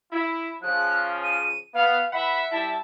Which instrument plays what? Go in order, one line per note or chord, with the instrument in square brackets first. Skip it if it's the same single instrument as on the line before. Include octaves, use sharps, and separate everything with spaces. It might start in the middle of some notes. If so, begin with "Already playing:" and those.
[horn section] E4
[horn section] C#3 F3 [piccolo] F#6
[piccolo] D#7
[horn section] B3 [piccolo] F5
[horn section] E3 F#5 B5 [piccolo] E5
[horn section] G3 E4 A5